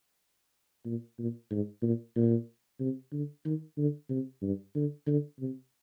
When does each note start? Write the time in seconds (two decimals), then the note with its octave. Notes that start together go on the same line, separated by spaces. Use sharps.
0.86 A#2
1.19 A#2
1.51 G#2
1.82 A#2
2.16 A#2
2.80 C3
3.12 D3
3.45 D#3
3.78 D3
4.09 C3
4.42 G2
4.75 D3
5.07 D3
5.39 C3